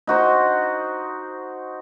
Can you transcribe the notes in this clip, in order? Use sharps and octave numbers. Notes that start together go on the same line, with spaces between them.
D#4 F#4 C5